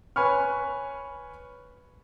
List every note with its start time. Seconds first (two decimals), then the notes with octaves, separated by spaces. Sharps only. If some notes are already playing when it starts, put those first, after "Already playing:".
0.16 B4 C#5 G#5 B5 C#6 F6